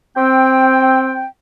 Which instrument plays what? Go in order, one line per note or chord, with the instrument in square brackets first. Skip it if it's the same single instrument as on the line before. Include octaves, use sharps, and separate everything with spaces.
[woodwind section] C4 G5